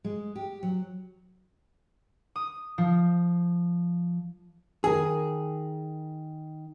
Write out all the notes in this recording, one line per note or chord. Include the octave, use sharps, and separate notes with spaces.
G#3
G4
F#3
D#6
F3
D#3 G#4 A#4